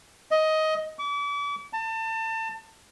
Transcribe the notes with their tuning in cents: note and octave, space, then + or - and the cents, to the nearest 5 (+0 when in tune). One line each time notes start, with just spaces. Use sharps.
D#5 +15
D6 -40
A5 +30